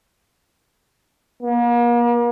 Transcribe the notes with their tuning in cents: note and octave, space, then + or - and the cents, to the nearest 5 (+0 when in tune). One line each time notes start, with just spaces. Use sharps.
A#3 +40